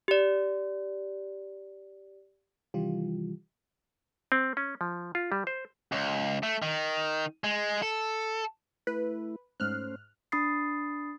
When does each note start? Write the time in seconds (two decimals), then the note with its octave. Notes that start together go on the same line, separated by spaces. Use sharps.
0.08 G4 D5
2.74 C3 D#3 E3 G3 F4 G4
4.32 C4
4.57 C#4
4.81 F3
5.15 F4
5.32 G3
5.47 C5
5.92 C#2
6.43 A3
6.62 D#3
7.44 G#3
7.82 A4
8.87 A3 E4 B4
9.60 G#2 A3 C#4 C5 F6 F#6
10.32 D4 B5 D#6 A6 C7